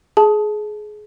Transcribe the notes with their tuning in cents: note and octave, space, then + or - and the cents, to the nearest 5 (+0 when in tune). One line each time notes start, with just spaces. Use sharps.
G#4 +25 A5 -15